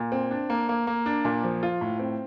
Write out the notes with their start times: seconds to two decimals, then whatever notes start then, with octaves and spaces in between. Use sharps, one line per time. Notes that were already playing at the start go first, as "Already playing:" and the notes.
Already playing: A#2
0.12 C4
0.31 D4
0.50 A#3
0.69 A#3
0.87 A#3
1.06 D4
1.25 A#2
1.43 F3
1.63 F4
1.81 A2
2.00 C4